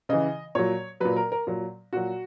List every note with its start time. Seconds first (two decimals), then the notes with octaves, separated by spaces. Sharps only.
0.09 C#3 E3 D#5
0.55 A#2 F#3 C#5
1.00 A#2 F#3 B4
1.16 A#4
1.32 A#4
1.47 A#2 F#3
1.93 A#2 F#3 F#4